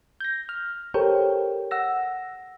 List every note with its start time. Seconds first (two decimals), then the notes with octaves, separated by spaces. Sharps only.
0.20 G6 A#6
0.49 F6
0.94 G4 A4 A#4 C5 C#5 G5
1.71 F#5 E6 A#6